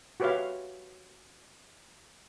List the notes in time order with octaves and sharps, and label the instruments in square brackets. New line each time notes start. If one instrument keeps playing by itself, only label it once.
[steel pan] F#4 G4 B4 C#5 E5 F5